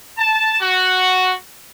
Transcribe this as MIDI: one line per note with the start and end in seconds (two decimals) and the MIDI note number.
0.18 0.58 81
0.61 1.32 66